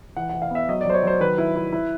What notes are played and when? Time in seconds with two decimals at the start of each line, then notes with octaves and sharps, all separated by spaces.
0.17 E3 F#5
0.29 E3 F#5
0.42 F5
0.50 B3 E5
0.69 F#3 D#5
0.81 D5
0.85 F#3 C5
0.94 C#5
1.03 F#3 C5
1.20 D#3 B4
1.38 E4
1.56 E4
1.72 E4